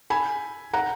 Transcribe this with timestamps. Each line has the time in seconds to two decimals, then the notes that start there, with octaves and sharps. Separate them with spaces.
0.10 G#5 B5
0.73 F#5 A#5